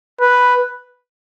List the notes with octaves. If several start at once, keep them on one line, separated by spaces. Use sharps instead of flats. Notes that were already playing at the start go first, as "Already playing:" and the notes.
B4